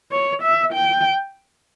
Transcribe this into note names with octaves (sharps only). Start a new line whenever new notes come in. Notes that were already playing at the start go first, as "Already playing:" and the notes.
C#5
E5
G5